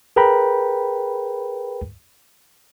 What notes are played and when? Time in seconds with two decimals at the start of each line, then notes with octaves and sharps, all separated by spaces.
0.16 G#4 A#4 B4 G5 A#5 B5